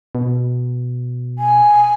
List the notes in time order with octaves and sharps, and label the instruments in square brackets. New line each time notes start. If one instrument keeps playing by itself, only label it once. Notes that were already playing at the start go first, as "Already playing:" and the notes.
[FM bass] B2
[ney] G#5